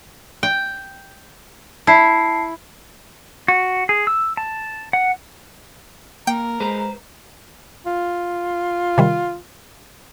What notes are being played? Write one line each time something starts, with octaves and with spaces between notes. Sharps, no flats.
G5
E4 A5 C7
F#4
G#4
E6
A5
F#5
A#3 A#4 G5
G#3 B4 C5 A#5
F4
C3 D#3 G3